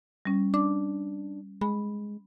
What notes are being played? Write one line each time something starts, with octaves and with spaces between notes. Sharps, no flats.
G3 C#4
D4 D6
G#3 B5